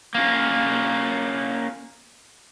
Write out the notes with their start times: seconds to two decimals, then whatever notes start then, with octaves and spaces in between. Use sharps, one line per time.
0.15 A#3 C#4